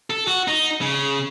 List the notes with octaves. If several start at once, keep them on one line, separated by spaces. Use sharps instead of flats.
A4
F#4
D#4
C#3